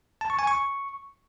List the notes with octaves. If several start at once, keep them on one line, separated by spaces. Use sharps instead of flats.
A5
C#6
G#5
C#6